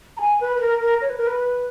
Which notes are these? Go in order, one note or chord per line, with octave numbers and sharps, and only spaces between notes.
A#5
G#5
B4
B4
A#4
A#4
C#5
B4
A#4
B4